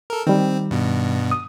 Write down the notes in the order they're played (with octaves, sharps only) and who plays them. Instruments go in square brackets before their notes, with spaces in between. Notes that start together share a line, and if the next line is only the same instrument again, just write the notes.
[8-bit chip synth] A4 A#4
[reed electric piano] D#3 G3 [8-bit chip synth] C4
[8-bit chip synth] G2 B2
[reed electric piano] D#6